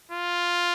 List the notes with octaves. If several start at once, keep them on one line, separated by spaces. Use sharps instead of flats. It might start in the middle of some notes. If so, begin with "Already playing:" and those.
F4